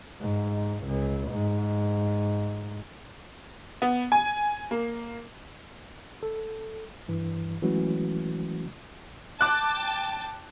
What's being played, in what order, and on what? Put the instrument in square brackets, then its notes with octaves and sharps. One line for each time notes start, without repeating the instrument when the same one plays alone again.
[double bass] G#2
C#2
G#2
[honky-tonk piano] B3
G#5
A#3
[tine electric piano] A4
G2 E3
E3 F#3 G#3 A3 C#4 F#4
[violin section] G5 A5 [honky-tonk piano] D6 F#6